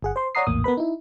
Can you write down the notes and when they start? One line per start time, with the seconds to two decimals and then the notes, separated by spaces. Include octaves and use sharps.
0.02 G1 G#4 F#5
0.16 C5 C6
0.35 C#5 D5 F#5 A#5 D#6 C7
0.47 A#1 E2 A2 A#3 D#6
0.64 B3 A#4 B4 B5
0.77 D#4 E4